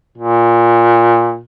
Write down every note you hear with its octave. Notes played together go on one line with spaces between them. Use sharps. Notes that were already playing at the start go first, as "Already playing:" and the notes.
A#2